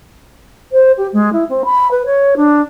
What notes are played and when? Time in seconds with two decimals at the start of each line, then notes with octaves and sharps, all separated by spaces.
0.72 C5
0.97 G4
1.12 G#3
1.32 E4
1.49 C4
1.64 B5
1.91 B4
2.05 C#5
2.36 D4